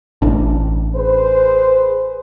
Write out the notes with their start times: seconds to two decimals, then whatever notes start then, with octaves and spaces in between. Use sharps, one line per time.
0.22 A1 D4
0.95 G#4 B4 C5